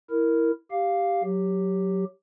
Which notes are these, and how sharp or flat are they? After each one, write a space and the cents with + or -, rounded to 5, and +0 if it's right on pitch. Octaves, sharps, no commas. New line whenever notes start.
E4 +0 A#4 -5
G4 +0 F5 +0
F#3 +0 G4 +0